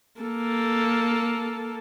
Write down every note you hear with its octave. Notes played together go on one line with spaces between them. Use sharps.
A#3 A4